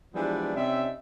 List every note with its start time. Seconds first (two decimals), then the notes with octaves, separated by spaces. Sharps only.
0.14 E3 F3 G3 G#3 B3 D4
0.55 C3 C#4 D#4 D5 E5